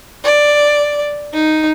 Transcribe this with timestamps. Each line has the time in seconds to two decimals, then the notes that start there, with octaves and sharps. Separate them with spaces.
0.24 D5
1.33 D#4